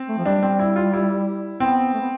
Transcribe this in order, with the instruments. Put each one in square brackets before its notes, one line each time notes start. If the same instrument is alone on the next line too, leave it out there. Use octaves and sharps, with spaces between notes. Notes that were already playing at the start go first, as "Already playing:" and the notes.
Already playing: [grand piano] C4
[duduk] A3
F3
[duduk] G3 [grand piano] D4
[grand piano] C4
E4
F4
E4
[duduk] B3 [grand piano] C4
[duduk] A3
B3